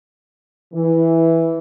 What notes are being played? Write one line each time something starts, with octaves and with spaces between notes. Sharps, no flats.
E3